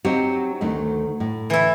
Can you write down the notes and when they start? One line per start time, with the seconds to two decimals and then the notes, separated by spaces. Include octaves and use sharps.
0.05 F#3 C4 D#4 G4
0.61 D2 D#3 A3
1.20 A2
1.50 E3 E4